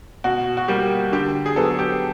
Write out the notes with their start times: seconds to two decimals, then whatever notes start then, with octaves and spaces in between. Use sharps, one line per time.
0.24 B2 F#4
0.57 F#4
0.68 G3 A#3 G4
1.12 D3 G4
1.46 G#4
1.56 F#3 B3 A4
1.79 G4